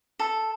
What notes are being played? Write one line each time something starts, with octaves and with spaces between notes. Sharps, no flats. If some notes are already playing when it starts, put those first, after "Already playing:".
A4